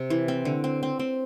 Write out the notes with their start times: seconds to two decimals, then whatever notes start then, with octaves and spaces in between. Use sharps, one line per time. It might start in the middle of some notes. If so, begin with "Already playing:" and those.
Already playing: C3
0.10 E3
0.28 C4
0.45 D3
0.64 C4
0.83 C4
0.99 C4